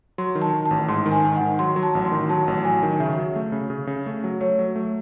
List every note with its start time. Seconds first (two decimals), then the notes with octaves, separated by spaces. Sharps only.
0.18 F#3 C6
0.35 D#3
0.42 A5
0.53 D#3
0.66 A5
0.71 A1
0.88 G#2 C6
1.06 D#3
1.11 G#5
1.24 G#2
1.36 D#3 F#5
1.59 F#3 C6
1.76 F#3
1.83 A5
1.95 A1
2.05 C6
2.12 D#3
2.29 F#3 A5
2.48 A1
2.65 F#3 G#5
2.83 D#3
3.00 C#3 E5
3.18 F#3
3.36 A3
3.52 C#3
3.70 C#3
3.87 C#3
4.06 A3
4.24 F#3
4.41 A3 C#5
4.59 F#3
4.76 A3